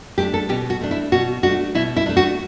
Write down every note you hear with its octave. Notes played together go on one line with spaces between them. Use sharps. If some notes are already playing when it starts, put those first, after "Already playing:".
A3 D4 G4
A4
B2 G4
F#4
A3 D4
E4
B2 F#4
A3 D4 F#4
B2 E4
E4
A3 D4
F#4